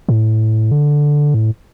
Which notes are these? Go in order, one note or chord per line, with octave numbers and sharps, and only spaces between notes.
A2
D3
A2